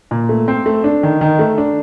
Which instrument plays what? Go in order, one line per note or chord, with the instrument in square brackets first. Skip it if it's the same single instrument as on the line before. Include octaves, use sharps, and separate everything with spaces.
[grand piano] A#2
A3
C4
A3
D4
D#3
D#3
A3
D4